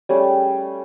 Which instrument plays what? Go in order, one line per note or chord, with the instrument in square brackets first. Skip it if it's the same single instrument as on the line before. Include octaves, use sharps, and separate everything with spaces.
[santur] G3 A3 C#4 G#4